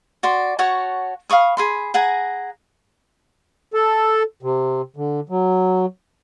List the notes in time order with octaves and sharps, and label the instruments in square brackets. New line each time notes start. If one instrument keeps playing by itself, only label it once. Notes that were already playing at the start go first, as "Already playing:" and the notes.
[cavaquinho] F#4 D5 C6
F#4 C#5 F#5 A5
F5 B5 C#6 D#6
G#4 B5 C6
G#4 F#5 G#5 A#5
[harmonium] A4
C3
D3
F#3